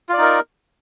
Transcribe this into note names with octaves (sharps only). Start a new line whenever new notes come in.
D#4 F4 A#4 D5